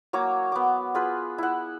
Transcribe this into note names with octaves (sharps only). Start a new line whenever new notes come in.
F#3 A#3 C#5 D6
B3 D6
F4 G#4 B4
E4 F#5